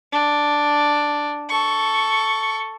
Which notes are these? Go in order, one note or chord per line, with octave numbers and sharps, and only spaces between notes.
D4
A4 C#6